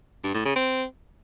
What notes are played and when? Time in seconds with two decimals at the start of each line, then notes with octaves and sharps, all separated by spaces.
0.24 G2
0.34 A2
0.45 C#3
0.56 C4